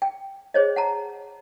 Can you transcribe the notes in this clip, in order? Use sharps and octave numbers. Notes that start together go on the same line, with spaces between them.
G5
G#4 C5 C#5 D#5
F#5 A5 A#5